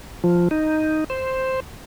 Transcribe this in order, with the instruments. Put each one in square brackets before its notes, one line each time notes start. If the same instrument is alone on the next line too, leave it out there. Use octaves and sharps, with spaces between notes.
[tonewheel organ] F3
D#4
C5